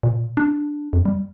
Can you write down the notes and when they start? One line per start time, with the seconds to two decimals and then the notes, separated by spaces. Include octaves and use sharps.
0.03 A#2
0.37 D4
0.93 F2
1.05 G3